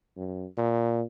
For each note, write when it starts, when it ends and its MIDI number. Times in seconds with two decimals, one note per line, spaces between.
0.17 0.45 42
0.57 1.02 46